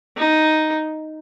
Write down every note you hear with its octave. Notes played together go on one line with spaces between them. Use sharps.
D#4